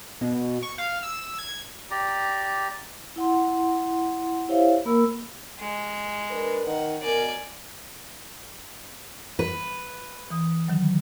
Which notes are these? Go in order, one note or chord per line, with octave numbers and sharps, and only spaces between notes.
B2
C#6
F5
E6
G#6
G4 D5 A#5
E4 F#5 C6
E4 G4 C5 C#5 E5 F5
A#3 A#4 B5 E6
G#3
D4 A#4 B4
D#3 D#4 F#5
D2 B2 A#4 D5 G#5
B4
E3 D#6
D3 D#3 F#3